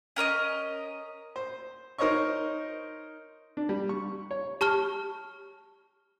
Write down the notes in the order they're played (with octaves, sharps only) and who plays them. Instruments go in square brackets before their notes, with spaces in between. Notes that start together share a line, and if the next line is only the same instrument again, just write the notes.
[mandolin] C#4 A#4 C#5 D#5
[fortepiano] C5
D#4 A#4 C5 C#5 D#5 C#6
D4
G3
C#6
C#5
[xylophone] G4 A5 C#6 F6